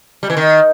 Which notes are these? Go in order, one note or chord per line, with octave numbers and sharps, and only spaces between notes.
G3
E3
D#3